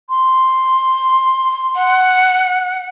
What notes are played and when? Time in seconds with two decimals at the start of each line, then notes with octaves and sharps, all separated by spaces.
0.10 C6
1.75 F#5